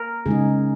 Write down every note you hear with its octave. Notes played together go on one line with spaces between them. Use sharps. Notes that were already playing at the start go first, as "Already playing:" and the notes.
Already playing: A#4
C#3 G#3 D#4 G#4